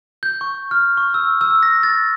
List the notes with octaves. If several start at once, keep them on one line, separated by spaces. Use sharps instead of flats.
G6
C#6
F6
C#6
E6
E6
A#6
A6